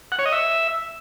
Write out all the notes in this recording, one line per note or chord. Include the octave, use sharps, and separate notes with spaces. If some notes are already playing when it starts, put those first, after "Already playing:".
F#5
C#5
D#5
E5